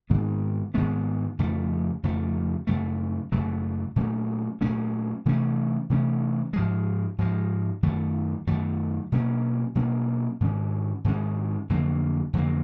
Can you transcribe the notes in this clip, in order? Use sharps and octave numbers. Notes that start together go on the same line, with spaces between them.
G#2 D#3 G#3 B3
G#2 D#3 G#3 B3
F2 C#3 F3 A3
F2 C#3 F3 A3
F#2 C#3 F#3 A3
F#2 C#3 F#3 A3
A#2 F#3 A3 C#4
A#2 F#3 A3 C#4
C3 E3 A3 C#4
C3 E3 A3 C#4
G#2 F3 G#3
G#2 F3 G#3
F#2 D#3 F#3 A3
F#2 D#3 F#3 A3
B2 F#3 A#3 C#4
B2 F#3 A#3 C#4
G#2 D#3 G#3 C#4
G#2 D#3 G#3 C#4
F2 D3 F#3 A#3
F2 D3 F#3 A#3